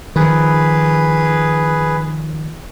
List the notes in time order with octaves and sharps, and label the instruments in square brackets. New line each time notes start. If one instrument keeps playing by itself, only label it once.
[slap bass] D#3 F3 [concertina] G#4 B4